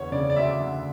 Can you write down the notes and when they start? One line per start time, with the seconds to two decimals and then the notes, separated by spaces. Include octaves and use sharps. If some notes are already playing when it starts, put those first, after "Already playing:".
Already playing: E2 D3 C#5
0.12 C#3 D5
0.30 D5
0.36 D2 E5
0.61 D3